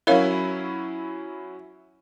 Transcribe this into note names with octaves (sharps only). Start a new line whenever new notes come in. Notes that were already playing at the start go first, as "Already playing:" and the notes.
F#3 C#4 E4 A#4 C#5 F5